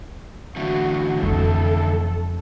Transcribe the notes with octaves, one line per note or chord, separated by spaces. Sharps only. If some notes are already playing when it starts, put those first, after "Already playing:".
D3 E3 A3 F#4
F2 A4